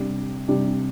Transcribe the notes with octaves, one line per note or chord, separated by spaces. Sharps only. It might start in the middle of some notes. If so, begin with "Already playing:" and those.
Already playing: C3 G3 D4
C3 G3 D4